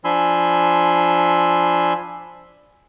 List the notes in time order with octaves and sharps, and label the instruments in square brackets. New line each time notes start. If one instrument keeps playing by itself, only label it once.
[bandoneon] F3 D4 G#5 B5 C6 E6